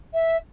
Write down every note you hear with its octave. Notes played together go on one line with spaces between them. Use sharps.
E5